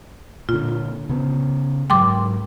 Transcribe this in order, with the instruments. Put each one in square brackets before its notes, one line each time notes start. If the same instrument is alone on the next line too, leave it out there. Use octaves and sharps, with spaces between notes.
[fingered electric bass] A#2 D3 [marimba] F4
[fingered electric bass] C#3 B3
[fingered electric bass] G#2 F#3 G#3 [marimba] G5 C6 D6